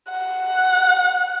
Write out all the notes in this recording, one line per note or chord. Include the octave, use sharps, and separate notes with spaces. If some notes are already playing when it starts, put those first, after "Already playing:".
F#5